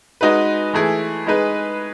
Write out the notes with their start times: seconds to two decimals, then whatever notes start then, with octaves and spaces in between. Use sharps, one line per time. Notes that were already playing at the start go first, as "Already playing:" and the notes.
0.21 G#3 D#4 F#4 B4
0.73 E3 A3 E4 G#4
1.27 G#3 D#4 G#4 B4